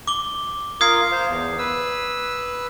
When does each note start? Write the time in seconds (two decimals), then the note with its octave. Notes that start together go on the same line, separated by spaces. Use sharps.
0.07 D6 G7
0.81 F4 A#4 D#6 G#6 C7
1.12 C5 F5
1.29 E2
1.58 B4 E6